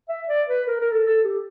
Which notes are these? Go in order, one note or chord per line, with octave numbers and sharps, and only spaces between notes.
E5
D5
B4
A#4
A#4
A4
A4
G4